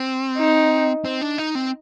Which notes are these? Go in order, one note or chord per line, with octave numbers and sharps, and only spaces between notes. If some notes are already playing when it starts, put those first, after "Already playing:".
Already playing: C4
D#4
C4
D4
D#4
C4